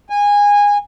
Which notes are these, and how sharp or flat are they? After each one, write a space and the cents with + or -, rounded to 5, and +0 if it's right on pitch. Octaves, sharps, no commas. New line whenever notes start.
G#5 -20